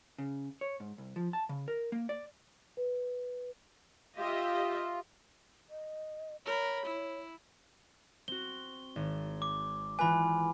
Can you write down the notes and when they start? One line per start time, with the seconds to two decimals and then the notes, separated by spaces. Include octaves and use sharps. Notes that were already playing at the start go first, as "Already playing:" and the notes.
0.18 C#3
0.61 C#5
0.80 G#2
0.98 C2
1.16 F3
1.33 A5
1.49 C#3
1.68 A#4
1.92 A#3
2.09 D5
2.77 B4
4.17 F4 G4 D#5 E5
5.70 D#5
6.45 A#4 C#5 B5
6.86 E4
8.28 C4 F#4 G7
8.96 G#1
9.42 D6
9.99 E3 F4 B4 G#5 B5